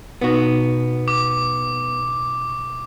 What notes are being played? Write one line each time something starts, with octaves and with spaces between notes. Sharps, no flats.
B2 B3 D#4 F#4
D6
C#6